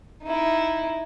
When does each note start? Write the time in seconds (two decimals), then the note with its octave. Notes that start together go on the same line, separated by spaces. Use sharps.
0.23 D#4 E4